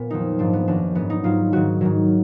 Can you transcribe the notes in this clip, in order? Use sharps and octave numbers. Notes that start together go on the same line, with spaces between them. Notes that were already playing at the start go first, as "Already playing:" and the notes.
Already playing: A#2 B3
F2 D#3 F#3 D#4
G#2 F3 D4
B3
F#2 D#3 F#3 D4
G#2 F#3 B3
D#4
G#2 F#3 F4
G#2 D#3 F#3 F#4
G#2 D#3 F#3